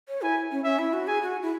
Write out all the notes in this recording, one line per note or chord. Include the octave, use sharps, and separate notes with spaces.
C#5
E4 G#5
C#4
C#4 E5
E4
F#4
G#4 G#5
F#4
E4